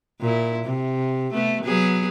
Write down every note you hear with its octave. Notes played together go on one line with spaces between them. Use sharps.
A#2 E4
C3
A3 B3
F#3 B3 G#4